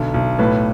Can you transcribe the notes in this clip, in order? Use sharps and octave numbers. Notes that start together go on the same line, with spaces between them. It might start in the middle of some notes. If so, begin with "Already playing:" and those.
Already playing: B1 D3
B1
A2 B4